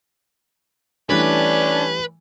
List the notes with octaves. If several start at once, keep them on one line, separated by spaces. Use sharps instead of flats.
E3 G3 A3 C#4 D4 B4